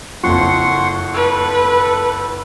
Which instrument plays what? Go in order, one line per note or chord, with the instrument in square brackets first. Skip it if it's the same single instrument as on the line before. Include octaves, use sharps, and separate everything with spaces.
[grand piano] F#1 F2 F3 [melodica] F#5 C6 C#6
[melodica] A4 [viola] B4